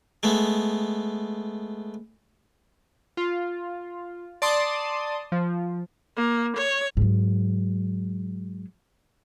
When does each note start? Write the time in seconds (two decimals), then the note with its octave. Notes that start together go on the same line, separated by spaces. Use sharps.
0.23 G#3 A3 B3
3.17 F4
4.42 D5 A5 C6 D#6
5.32 F3
6.17 A#3
6.57 C#5
6.97 G#2 F#3